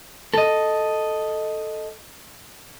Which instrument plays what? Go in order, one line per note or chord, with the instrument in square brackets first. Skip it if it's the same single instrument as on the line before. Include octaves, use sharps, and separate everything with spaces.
[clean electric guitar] A4 D#5